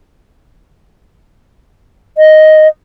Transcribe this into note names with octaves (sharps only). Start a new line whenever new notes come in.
D#5